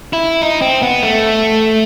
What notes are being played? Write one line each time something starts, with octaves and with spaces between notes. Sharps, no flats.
E4
D#4
C4
B3
A3